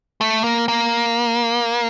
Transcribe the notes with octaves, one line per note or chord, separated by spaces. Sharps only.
A3
A#3
A#3